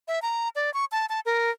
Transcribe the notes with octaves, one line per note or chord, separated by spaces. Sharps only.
E5
A#5
D5
C#6
A5
A5
A#4